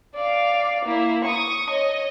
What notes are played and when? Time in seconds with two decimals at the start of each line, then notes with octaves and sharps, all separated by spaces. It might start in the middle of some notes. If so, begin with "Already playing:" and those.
0.15 D5 F5
0.85 A#3 E4
1.24 C#6 D#6
1.70 C#5 D#5